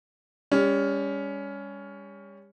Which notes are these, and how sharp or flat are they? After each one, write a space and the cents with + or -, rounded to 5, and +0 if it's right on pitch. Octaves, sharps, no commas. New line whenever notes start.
G3 +40 C#4 +20